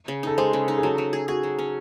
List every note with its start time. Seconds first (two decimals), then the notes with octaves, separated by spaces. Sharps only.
0.08 C#3
0.23 D#4 A4
0.38 G#3 C5
0.53 C#3
0.68 D#4
0.78 G#4
0.83 F#3 A4
0.98 F#3
1.13 G#4
1.28 F#4 G#4
1.43 F#3
1.59 C#4